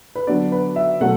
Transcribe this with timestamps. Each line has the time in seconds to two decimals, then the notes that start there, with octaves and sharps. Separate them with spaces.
0.15 B4
0.27 D3 F#3 B3 D4 D5
0.52 B4
0.76 E5
1.01 B2 F#3 A3 F#5